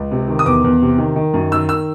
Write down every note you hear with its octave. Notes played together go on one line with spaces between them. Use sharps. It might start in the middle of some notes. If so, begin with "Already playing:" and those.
Already playing: C#2
C3
D#3
D#6
E2 D6
E2
C3
D#3
D#3
F#2
D#3 E6
E6